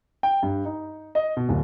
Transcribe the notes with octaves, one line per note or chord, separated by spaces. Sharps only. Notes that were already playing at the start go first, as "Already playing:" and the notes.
G5
G2
D#4
D#5
B2
D1